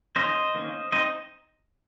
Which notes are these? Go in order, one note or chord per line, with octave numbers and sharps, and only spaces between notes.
D#3 A#3 C#4 C5 D#5
D#3 A#3 C#4
C4 D#4 C5 D#5